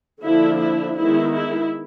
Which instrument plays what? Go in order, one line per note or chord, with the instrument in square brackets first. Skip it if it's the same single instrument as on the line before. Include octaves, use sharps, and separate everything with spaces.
[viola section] D3 F3 A#3 D4 E4
E4
D#3 G#3 B3 D#4 E4
E4